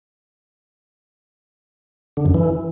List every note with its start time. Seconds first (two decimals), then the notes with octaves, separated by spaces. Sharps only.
2.17 D3
2.26 F#2
2.34 E3